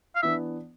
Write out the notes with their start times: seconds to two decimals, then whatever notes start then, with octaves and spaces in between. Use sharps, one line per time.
0.16 F5
0.23 E3 B3 D4 E5